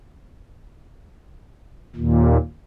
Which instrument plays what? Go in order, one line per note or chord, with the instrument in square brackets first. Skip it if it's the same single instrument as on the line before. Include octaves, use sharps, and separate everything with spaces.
[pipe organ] D#2 A#2